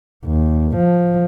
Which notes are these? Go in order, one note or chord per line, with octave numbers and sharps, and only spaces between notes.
D#2
F3